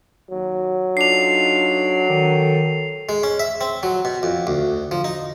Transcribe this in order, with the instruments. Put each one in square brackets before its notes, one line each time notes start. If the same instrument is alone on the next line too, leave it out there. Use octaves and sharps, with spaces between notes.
[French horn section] D#2 [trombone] F#3
[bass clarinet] D4 [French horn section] D#4 F4 A4 [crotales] C7 F7
[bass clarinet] D#3 [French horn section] A4
[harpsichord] G#3
C#4
E5
C4
F#3
B2
F2
D2
F3
D#4